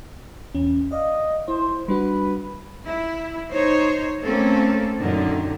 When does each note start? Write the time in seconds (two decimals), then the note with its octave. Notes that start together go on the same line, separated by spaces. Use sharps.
0.55 E2 C#4
0.92 D5 D#5 F5
1.48 E4 C5
1.88 G3 D4 F#4 B4
2.85 E4
3.51 D#4 C5 C#5
4.23 A3 A#3 C4 C#4 A4
4.99 F#2 A#2 D3 D#3